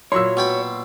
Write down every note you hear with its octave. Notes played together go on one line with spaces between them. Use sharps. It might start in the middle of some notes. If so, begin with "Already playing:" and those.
A#2 F#3 E4 C#5 C6 E6
B2 G5 B5